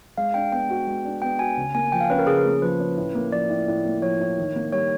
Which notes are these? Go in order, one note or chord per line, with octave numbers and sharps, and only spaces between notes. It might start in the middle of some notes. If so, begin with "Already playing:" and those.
G#3 F5
D4 G5
B3 G5
F#4
G#3
D4
B3 G5
F#4 G#5
C#3
A#3 G#5
F3 G5
F5
C#4 B4
A#4
C#3 G#4
A#3
F3 B4
C#4
A2
A#3
F3 D5
A2
A2
A#3
F3 C#5
A2
D#3
A#3
G3 C#5